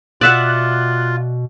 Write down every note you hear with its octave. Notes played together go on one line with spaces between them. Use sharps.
B2 F4 D5 E5 F#5 F#6